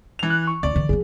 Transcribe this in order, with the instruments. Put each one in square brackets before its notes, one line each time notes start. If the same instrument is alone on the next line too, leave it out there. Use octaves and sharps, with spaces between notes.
[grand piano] E3 F7
[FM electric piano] F#6
C#6
[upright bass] D2 C#4 [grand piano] D5
[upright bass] D3 E3
[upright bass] F3 B3 [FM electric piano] G#4